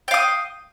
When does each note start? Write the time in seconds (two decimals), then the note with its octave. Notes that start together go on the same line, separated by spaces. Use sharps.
0.08 G5
0.11 F5
0.14 D#6